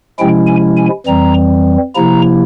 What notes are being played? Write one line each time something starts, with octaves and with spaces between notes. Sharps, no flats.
C3 F3 G#3 C#4 E4 G5
G#5
G#5
F2 E3 G3 C4 A#5
C3 F3 A#3 E4 A#5